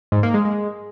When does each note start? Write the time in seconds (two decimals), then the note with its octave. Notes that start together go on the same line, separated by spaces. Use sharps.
0.12 G#2
0.23 A#3
0.34 G#3
0.45 G#3